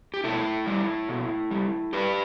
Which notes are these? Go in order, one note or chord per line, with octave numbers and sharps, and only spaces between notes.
G4
B2 E4 A4
G3
B2
G3
G2 G4 B4